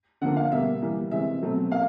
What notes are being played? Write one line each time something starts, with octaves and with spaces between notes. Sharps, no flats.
D3 F3 A#3 F#5
F5
B2 G3 A#3 E5
E3 G3 A#3
C3 E3 G#3 C4 E5
B2 F#3 A3 C4
A#3 F5